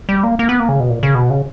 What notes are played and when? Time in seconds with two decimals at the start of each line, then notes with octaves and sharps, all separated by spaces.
0.09 G3
0.23 A#3
0.39 A#3
0.49 B3
0.60 A#3
0.69 C#3
0.80 B2
0.90 A#2
1.03 C#3
1.15 B2
1.30 C#3